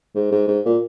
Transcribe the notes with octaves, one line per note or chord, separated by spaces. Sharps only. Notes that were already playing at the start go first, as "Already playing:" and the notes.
G#2
G#2
G#2
A#2